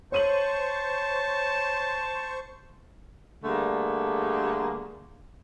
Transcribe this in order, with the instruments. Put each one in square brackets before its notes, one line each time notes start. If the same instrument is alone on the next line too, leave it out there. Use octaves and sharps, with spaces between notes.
[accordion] C5 C#6 [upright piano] C#5 D#7 F#7 [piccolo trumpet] A5
[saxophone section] D3 G3 A3 A#3 G#4